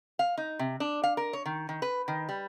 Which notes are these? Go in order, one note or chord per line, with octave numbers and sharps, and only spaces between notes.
F5
D#4
C3
D4
F5
A#4
C#5
D#3
D#3
B4
D#3
G3